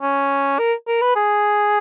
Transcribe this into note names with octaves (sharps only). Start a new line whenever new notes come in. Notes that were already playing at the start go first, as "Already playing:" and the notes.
C#4
A#4
A#4
B4
G#4